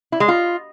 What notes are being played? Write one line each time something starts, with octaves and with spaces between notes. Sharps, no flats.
E4
G#3
F4